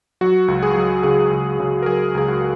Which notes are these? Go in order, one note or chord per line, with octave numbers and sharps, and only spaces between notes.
F#3 F#4
C#2
G#4
F#3
C#3 G#4
C#2
C#3
A#4
F#3 G#4
C#2 G#4
F#4